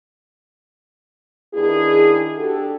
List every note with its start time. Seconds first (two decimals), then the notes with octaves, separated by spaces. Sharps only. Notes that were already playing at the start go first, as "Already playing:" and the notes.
1.54 D#3 B3 D4 E4 G#4
2.37 D4 F#4 G4 A4